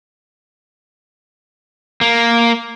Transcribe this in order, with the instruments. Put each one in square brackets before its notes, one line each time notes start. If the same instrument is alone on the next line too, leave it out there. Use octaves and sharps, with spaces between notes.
[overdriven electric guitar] A#3